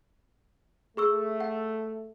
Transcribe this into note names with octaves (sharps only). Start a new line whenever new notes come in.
A3 G#4 C#6 E6
F#5